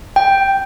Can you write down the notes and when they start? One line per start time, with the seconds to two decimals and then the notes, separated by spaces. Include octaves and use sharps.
0.16 G5